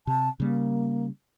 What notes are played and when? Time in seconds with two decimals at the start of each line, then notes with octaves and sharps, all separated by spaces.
0.07 C3 A5
0.40 C#3 G3 A#3